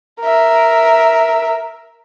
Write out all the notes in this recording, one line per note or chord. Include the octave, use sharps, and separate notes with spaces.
A#4 E5